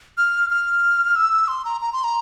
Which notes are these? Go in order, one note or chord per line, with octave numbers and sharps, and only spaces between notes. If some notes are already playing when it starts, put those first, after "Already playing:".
F6
F6
E6
C6
A#5
A#5
C6
A#5